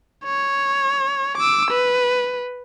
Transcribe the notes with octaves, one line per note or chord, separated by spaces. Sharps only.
C#5
D6 E6
B4